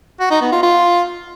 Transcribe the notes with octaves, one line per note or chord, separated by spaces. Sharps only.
F#4
D#4
B3
F4
F4